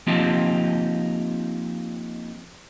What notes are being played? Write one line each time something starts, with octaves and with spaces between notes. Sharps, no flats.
F3 A#3 C4 D#4 F4 G4